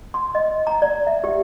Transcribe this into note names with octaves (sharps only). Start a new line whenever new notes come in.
C6
D#5
A#5
D5
E5
G4